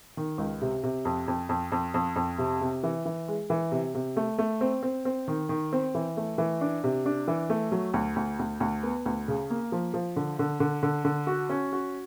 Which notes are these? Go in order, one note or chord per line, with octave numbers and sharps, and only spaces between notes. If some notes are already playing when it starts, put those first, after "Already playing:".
D#3
C#2
C3
C3
F2
F2
F2
F2
F2
F2
C3
C3
E3
E3
G#3
E3
C3
C3
A3
A3
C4
C4
C4
D#3
D#3
C4
E3
A3
E3
D4
C3
D4
E3
A3
F#3
D2
D2
D2
D2
B3
D2
C#3
A#3
F3
F3
D3
D3
D3
D3
D3
F#4
C#4
F#4